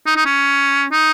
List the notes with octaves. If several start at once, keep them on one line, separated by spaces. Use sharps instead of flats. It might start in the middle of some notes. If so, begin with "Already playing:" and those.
D#4
D#4
C#4
D#4